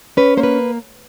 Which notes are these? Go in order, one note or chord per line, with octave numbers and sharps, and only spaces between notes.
C#4 B4
A#3 C5
B4